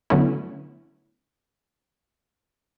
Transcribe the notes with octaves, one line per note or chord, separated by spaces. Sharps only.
D3 F#3 A3 B3 C#4 E4